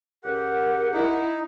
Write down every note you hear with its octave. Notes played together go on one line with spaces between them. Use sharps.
C#2 G4 A#4 F#5
D#4 E4